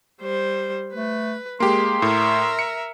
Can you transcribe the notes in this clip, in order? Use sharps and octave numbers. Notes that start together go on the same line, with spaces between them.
G3 C5
A3 B4
G#3 A#3 G4 C6
A2 A#4 E5
C#7